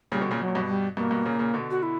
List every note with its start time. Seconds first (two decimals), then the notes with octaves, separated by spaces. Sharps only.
0.12 A#2 C#3 G3
0.21 B2 D3
0.31 A#2 C#3
0.40 B2 F#3
0.48 A#2
0.55 G2 B2
0.68 G3
0.97 G2 B2 A#3
1.11 G2 B2
1.25 A#2 C#3
1.39 A#2 C#3
1.54 B2 D3
1.71 F#4
1.83 E4